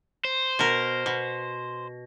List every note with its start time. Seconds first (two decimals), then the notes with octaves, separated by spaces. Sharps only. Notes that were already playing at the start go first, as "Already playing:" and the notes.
0.25 C5
0.59 B2 A#4
1.06 B2